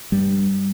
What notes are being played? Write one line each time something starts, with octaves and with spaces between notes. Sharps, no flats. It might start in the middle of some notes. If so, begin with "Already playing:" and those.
G2 G3